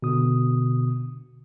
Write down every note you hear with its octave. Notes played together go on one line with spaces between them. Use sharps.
B2 D3 D#6